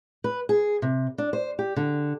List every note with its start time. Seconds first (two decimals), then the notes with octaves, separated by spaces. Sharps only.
0.24 B4
0.49 G#4
0.82 C3
1.18 D4
1.33 C5
1.59 G4
1.76 D3